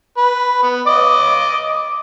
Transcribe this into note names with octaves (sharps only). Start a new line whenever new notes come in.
B4
B3
D#5 D6